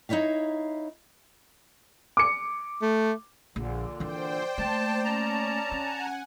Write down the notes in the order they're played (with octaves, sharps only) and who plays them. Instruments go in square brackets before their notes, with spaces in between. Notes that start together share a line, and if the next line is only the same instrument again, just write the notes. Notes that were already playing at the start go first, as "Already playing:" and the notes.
[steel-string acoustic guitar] D#4 E4 C#5 E5 F5
[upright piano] D6 C#7
[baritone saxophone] A3
[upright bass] A#1 [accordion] A#2 D3
[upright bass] E3 D4 [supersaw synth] C5 G5 [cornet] D5
[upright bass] A3 A#3 [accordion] A5
[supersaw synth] C#4 [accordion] A5 A#5
[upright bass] C#4 [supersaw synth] F#5 G#5